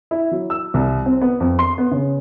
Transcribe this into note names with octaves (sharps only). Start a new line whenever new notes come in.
E4
F#3
E6
C2
C4
B3
F2
C6
B3
C#3